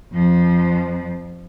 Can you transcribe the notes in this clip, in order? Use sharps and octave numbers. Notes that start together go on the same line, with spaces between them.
F2 F3